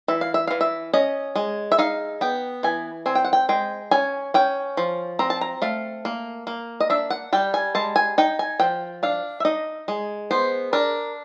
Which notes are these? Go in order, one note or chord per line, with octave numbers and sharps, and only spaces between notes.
E3 E5
F5
E5
E3 F5
E5
C#4 D#5
G#3
E5
D#4 F5
B3 G5
E3 G#5
C4 G#5
G5
F#5
G5
G#3 G5
C#4 G#5
C#4 G5
F3
C4 A#5
A5
A#5
A3 F5
A#3
A#3
D#5
D4 E5
F#5
G3 G5
G#5
G#3 A5
G#5
D#4 G5
G#5
F3 G5
D4 F5
E5
D#4 D#5
G#3
B3 C5
D4 A#4